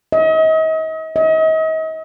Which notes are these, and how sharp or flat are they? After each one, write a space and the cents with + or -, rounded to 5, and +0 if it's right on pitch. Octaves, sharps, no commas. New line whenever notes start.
D#5 +40
D#5 +40